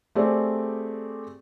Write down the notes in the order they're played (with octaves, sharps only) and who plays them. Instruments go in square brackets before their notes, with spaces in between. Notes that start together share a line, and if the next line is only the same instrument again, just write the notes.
[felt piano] A3 C4 G4 G#4 D5